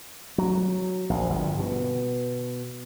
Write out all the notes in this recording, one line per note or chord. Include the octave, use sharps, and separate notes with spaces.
F#3
A#1
G1
B2